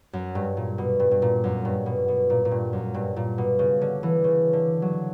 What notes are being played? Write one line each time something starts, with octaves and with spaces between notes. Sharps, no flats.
F#2
G2
A#2
B2
G2
G2
A#2
F#2
G2
B2
B2
A#2
A#2
G2
F#2
G2
A#2
B2
C#3
D3
E3
C#3
D3
F#3